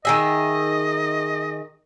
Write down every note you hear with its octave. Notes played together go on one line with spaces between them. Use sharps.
D#3 G#4 D#5 E5